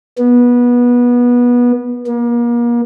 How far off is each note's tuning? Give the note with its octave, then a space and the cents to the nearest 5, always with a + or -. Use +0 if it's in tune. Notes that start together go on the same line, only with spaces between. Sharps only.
B3 -20
A#3 +35